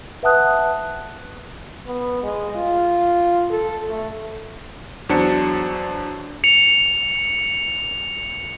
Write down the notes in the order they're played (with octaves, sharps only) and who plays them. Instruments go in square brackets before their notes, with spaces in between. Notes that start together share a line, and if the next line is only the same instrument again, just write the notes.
[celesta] B4 E5 F#5 A5 D#6 F#6
[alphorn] B3
G#3
F4
A4
A3
[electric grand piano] E2 F#3 D4 C5 A5 C#7
[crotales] C#7 F7